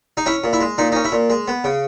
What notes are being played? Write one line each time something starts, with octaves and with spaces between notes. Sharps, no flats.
D#4
C#4 E4
A#2
E4
G#3
A#2 D#4
C#4 D#4
E4
A#2
G#3
B3
C#3